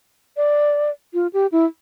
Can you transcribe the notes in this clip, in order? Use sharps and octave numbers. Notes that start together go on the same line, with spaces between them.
D5
F4
G4
E4